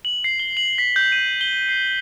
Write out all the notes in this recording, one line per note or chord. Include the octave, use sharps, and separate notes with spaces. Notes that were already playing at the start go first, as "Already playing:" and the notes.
F#7
C7
G7
F#7
B6
G6
D#7
G7
C7